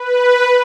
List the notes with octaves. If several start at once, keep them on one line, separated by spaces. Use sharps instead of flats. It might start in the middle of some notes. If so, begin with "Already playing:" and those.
Already playing: B4